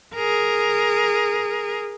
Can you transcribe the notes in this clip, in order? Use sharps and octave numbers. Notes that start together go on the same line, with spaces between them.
G#4 A#4